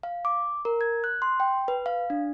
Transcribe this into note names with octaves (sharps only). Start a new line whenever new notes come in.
F5
D6
A#4
G#6
F#6
C6
G5
B4
F5
D4